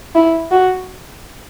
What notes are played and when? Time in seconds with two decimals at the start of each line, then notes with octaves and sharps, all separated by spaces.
0.15 E4
0.51 F#4